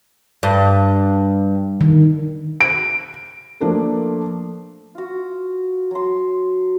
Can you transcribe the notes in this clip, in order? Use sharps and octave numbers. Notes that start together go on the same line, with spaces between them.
G2
D#3
D7
F3 A3 A#3 D4 A4 A#4
F4 F#4
F#3 C6